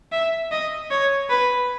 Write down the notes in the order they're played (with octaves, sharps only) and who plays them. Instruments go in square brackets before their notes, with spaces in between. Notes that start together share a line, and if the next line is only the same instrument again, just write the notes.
[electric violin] E5
D#5
C#5
B4